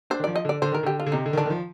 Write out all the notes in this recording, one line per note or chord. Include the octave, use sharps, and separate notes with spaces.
D4 C5
D#3
F3 D5
D#5
D3 D5
D3 C5
D#3 A#4
D3 G4
F4
D3
C3 D#4
D3
D#3
D3 D4
D#3
F3